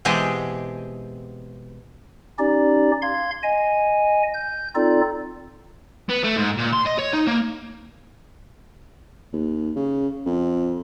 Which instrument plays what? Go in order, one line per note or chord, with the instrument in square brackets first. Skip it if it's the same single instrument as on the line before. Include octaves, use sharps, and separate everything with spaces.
[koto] B2 E3 G#3 C4 G4 G#4
[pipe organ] C#4 D#4 G4 D5
F5 C6 G#6
D#5 G#5
G6
C4 D#4 F4 A4 D5
[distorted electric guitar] B3
A3
G#2
A#2
C6
D#5
C#5
D#4
A#3
[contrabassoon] D#2
C#3
F2